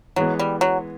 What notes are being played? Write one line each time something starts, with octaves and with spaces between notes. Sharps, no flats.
E3 F#3 G#3 B3
G3
F#3